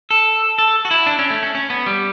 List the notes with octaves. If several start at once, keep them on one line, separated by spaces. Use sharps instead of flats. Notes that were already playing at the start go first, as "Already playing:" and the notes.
A4
A4
F#4
E4
D4
C#4
A3
C#4
C#4
B3
G3